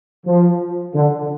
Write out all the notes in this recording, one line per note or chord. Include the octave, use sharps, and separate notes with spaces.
F3
D3